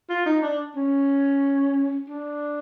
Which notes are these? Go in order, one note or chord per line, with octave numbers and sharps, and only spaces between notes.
F4
D#4
D4
C#4
D4